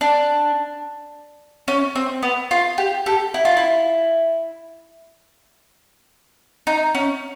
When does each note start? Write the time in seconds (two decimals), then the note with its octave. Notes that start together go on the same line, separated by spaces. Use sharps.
0.01 D4
1.68 C#4
1.95 C4
2.23 B3
2.51 F4
2.78 G4
3.06 G4 A4
3.34 E4
3.45 F4
3.57 E4
6.67 D#4
6.95 C#4